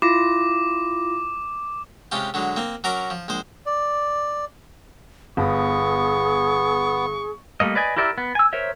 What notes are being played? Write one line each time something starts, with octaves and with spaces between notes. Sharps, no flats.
E4 F4 D6 A#6
C3 G#3 C#4 F4 G4
D3 F#3 G#3
A#3 C4
F#3 C#4 A#4 A#5 D6
F3
A#1 G#3 C5
D5
G1 B3 G#4 C#6
G3 A3 A#3 D#5
B4 D5 D#5 G#5
E4 G4 A#4 D5 E5
B3
G#5 E6
A#4 C5 C#5 E5